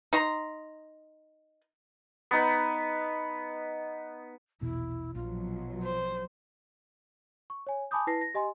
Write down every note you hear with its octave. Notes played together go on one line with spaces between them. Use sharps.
D#4 A#5 C6
B3 D#4 B5
A#1 E2 B2 E4
A#1 B2 F3 F#3 F4
C5
C#6
C#5 G#5
G#5 A5 B5 D6 D#6 G6
E4 B4 A5 A#6 C7
A#6
G4 D#5 G#5 C6